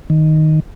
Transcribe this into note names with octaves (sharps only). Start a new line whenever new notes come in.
D#3